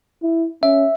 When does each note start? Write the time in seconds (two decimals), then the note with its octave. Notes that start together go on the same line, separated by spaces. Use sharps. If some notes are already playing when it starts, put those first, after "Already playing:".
0.22 E4
0.63 C#4 E5